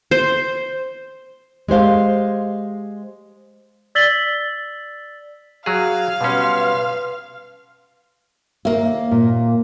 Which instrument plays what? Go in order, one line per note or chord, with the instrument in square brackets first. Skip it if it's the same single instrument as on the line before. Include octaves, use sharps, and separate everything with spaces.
[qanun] C5
[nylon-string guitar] G#3 G4 C5 F5
[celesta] D5 E6 A6 B6 F#7 G7
[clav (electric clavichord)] F#3 G#4 [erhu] F5
[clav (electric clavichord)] B2 G3 C#4 [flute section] B4 C6
[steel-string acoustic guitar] D#2 A#3 [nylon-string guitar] E5
[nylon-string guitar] A#2